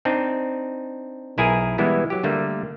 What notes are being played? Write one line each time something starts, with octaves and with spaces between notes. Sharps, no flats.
C4 D4 D#4
B1 E4 G#4 A#4 G#5
E3 G3 G#3 B3 E4
F#3 G4
D3 G3 A3 A#3 D4